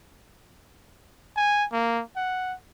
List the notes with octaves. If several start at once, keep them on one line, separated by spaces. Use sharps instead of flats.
G#5
A#3
F#5